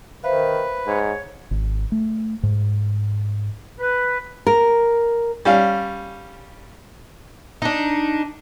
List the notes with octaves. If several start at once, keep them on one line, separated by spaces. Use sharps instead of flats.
D#3 B4 C5 E5 F5
G#2 C#5
G#1
A3
G#2
B4
A#4
G3 C#4 F5
D4 D#4